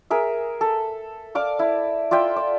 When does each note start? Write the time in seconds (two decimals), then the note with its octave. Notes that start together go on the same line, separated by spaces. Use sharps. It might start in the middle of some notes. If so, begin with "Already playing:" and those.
0.10 G#4 A#4 E5
0.61 A4
1.35 D5 F5 D6
1.59 E4
2.11 F4 D5 E5 G5
2.36 D5